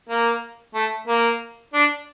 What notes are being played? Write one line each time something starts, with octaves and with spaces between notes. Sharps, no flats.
A#3
A3
A#3
D4